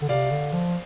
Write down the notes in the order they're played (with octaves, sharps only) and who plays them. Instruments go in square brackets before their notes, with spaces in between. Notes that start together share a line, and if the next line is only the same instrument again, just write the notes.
[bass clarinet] D3
[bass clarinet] C3 [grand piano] D5 F5
[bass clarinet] D3
F3